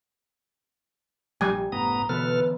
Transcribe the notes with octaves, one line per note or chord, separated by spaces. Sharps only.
A#1 A#2 G3 G#5
F#1 A2 B3 A#5 D#6
B2 D3 E3 B3 A4 B4 F6